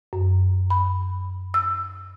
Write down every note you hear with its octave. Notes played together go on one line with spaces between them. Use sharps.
F#2
B5
E6